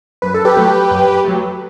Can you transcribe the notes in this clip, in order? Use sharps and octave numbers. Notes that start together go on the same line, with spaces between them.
F#2 B4
A4
G4 B4
F#3 A3
F#2
F#3 A3